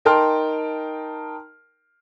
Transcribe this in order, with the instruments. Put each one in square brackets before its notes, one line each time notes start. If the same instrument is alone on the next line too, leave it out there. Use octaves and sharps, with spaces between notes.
[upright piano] D#4 A#4 G5 A5 C6 F6